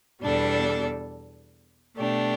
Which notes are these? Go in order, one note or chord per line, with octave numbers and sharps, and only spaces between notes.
E2 B2 G3 D4 A4
B2 A3 D4 G4